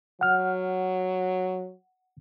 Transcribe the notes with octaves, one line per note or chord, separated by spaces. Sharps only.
F#3 F#5 F6